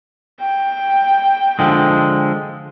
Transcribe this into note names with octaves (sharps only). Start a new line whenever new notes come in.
G5
D3 F3 G#3